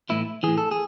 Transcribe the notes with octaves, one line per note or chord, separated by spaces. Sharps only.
A2 E3 E4
A2 E3 G#4
A4
G#4